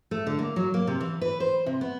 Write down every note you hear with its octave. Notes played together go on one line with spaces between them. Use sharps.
A3
D3
A#3
F#3
A#3
C3
E3
B4
C5
C3
B3